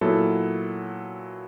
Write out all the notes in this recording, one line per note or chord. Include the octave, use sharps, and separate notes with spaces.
A#2 F#3 B3 E4 A4